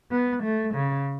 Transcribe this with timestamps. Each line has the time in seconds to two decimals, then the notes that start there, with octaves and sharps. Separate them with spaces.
0.11 B3
0.43 A3
0.74 C#3